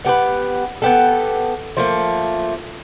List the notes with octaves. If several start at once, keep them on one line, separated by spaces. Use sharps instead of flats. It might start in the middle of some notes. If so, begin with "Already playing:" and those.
B3 G4 A4 B4
B3 G4 A4
F3 A3 A#3